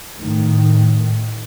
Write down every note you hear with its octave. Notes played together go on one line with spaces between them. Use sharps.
A2 D#3